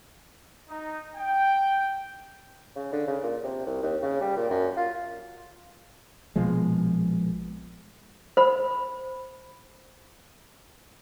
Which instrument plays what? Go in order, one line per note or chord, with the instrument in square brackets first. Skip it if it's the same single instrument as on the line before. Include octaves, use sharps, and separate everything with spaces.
[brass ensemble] D#4
G5
[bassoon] C#3
D3
C#3
A#2
C3
C2
D#2
C#3
G3
A#2
F#2
F4
[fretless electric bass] A#1 B2 F3 G#3
[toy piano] C5 B5